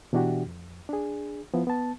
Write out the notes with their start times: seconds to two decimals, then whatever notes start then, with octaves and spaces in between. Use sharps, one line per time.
0.13 B2 E3 D4 E4 F#4 G4
0.46 F2
0.89 D4 G#4
1.54 F3 B3 E4
1.67 B3 A5